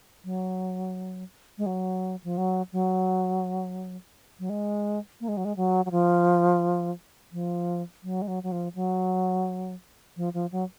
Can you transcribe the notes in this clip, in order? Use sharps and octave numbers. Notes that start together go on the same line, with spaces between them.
F#3
G#3
F#3
F3
F#3
F#3
F#3
G#3
A#3
G#3
F#3
G#3
F#3
F#3
F3
F3
F#3
G#3
F#3
F#3
F3
F#3
F3
F3
F#3